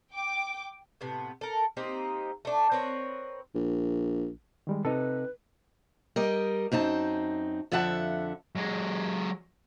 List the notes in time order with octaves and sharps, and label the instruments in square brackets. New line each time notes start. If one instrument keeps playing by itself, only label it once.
[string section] G5 D6
[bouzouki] A2 C3 B3
A4 A#4
A#3 C4 D#4 G4
A3 D4
C4 A#4 B4 C#5
[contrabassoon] A#1
[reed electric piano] D#3 G3 G#3
[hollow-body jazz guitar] C3 D#4 [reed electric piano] A4 [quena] B4
[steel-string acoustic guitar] G3 A#4 D#5
F#2 C4 D#4 A5
F2 D3 F3 E5 F#5 A5
[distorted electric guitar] F#3 G#3